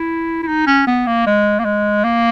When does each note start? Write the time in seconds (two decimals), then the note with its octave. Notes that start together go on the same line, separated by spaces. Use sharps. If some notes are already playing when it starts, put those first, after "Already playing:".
Already playing: E4
0.43 E4
0.48 D#4
0.67 C#4
0.87 B3
1.06 A#3
1.26 G#3
1.59 A#3
1.65 G#3
2.04 A#3